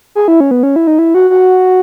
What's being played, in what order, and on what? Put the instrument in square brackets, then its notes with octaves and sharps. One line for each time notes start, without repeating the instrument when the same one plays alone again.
[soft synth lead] G#4
E4
C#4
B3
C#4
E4
D#4
E4
F#4
F#4